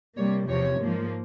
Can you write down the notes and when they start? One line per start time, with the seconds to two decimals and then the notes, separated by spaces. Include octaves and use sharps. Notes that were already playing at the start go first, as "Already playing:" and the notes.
0.15 C3 G3 A#3 C#5
0.48 E2 C3 F3 C#5
0.80 G#2 F3 A#3